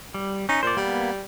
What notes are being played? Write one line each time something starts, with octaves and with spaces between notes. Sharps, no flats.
G3
C#4 D#4
A#2 C5 D5
G3 A#3 B3